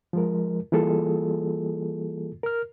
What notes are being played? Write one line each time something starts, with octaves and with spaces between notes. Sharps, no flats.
F3 G#3 A#4
E3 G3 A#3 F4 G#4 A4
A#4 F6